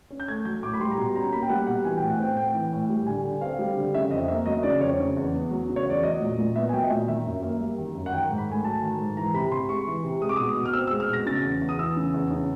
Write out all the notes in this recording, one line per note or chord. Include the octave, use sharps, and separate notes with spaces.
C#4
G6
A3 G#6
F#3 G6
A2 D6
B5
G3 C6
A#5
B2 B5
C#4 A#5
A#3 B5
G5
G3 F#5
B2 F#5
E3 G#5
A2 G5
F#5
C4 G5
A3 G5
E3
A2
G3
D3 G#5
D3
C4 F5
G3
D3
C#3 E5
F2 D#5
A#3 E5
F#3 D#5
C#3 D5
F2 C#5
C#3
E2
B3
F#3
C#3
C#5
E2 D5
F#3 D#5
A#2
A#2
B3 E5
G#5
F#3 G5
D#5
A#2 E5
D#3 E5
F#2
A#3
G3
D#3
F#2
F#5
D#3 G5
G#2
B5
A3 G#5
F#3 A5
D#3
G#2
E3 A#5
C3 B5
C3 C6
G#3 C#6
E3
C3
G#3 D#6
D6
B2 D#6
B2
F6
C4 E6
G#3 E6
F6
B2 A#6
C#3 A6
E2
E2
D#6
E3 E6
C#3
E2
C#3